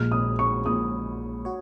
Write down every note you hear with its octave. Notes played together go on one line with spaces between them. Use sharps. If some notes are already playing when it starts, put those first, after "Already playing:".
Already playing: A#1 A#2 G#3 F6
D#6
C#6
A#1 A#2 G#3 D#6
F#4 C#5